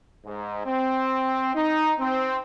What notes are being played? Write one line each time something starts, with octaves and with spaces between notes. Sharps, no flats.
G#2
C4
D#4
C4